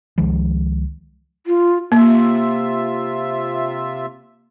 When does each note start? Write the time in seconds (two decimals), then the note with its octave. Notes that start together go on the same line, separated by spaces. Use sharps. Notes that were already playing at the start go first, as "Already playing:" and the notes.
0.18 C#2 D#3 F3 G#3
1.47 F4
1.92 C3 A#3 F4 E5